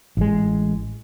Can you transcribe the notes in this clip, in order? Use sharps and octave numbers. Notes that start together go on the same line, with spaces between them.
A1 G#3